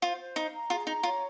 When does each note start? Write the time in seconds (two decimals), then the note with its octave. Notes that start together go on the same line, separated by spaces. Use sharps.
0.02 F4 C5
0.19 C5
0.36 D#4 F5
0.53 A#5
0.70 F4 G#4
0.87 D#4 A#5
1.03 F4 C#5